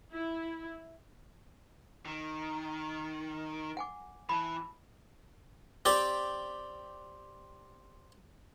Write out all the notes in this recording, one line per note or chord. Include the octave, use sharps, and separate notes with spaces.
E4
D#3
F#5 G#5 D6
E3 A5 B5
C4 G4 D5 G5